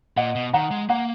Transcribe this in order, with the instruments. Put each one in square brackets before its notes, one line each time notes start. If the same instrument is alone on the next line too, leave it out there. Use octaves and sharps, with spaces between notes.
[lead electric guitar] A#2 [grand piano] D#5 F#5
[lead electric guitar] B2
[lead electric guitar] D#3 [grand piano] F#5 A#5
[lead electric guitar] G#3
[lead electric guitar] A#3 [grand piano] F#5 A#5